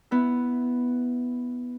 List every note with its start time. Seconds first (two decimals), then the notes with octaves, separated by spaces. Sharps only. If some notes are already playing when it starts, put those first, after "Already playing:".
0.11 B3 E4